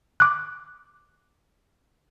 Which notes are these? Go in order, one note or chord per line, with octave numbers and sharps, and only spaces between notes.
D6 F#6